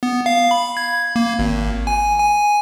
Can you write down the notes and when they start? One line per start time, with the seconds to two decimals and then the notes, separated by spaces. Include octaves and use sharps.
0.03 B3
0.26 F5
0.51 B5
0.77 G#6
1.16 A#3
1.39 G#1
1.87 G#5
2.19 G#5